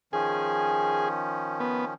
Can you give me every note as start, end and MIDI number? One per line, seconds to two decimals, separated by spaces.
0.13 1.94 51
0.13 1.94 53
0.13 1.94 61
0.13 1.09 68
1.60 1.85 59